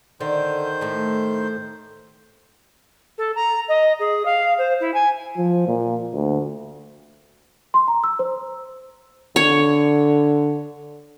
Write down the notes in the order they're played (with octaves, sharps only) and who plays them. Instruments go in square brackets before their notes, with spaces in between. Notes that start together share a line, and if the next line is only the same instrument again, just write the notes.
[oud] D3 [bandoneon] D#3 C5 G6
[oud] A2 A3
[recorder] A4
A#5
D#5
G#4
F5
C5
E4
G#5
[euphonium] F3
A#2
D2
[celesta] C6
A#5
E6
C5
[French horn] D3 [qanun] C#5